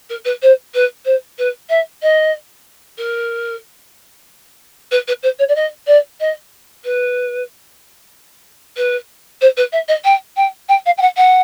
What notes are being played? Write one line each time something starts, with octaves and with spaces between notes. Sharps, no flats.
A#4
B4
C5
B4
C5
B4
E5
D#5
A#4
B4
B4
C5
C#5
D5
D#5
D5
D#5
B4
B4
C5
B4
E5
D#5
G5
G5
G5
F5
G5
F#5
F#5